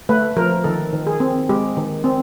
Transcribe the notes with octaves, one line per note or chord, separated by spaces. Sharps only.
A3 B4
F3 A#4
D#3 A4
D#3
G#4
C4
G#3 G4
D#3
C4